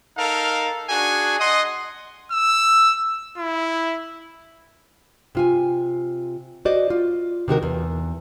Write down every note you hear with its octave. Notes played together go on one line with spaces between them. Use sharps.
D#4 A4 A#4 F5
D4 F#4 G#4 G#5
D#5 F#5 C6 D#6
E6
E4
C3 F4 G#5
F#4 C5 D5 D#5
F4
C3 D#3 F#4 A#4
E2